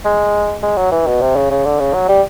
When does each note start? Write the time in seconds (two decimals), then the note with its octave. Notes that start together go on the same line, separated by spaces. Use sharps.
0.05 G#3
0.63 G#3
0.77 F#3
0.92 E3
1.07 B2
1.21 C3
1.36 C#3
1.51 C#3
1.65 D3
1.80 C#3
1.94 F#3
2.09 G3